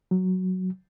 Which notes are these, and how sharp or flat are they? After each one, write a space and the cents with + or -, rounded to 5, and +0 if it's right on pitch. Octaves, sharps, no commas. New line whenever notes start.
F#3 +0